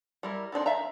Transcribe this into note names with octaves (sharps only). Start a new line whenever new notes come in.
G3 E4 A#4
C4 D4 D#4 A4
E5 F5 A#5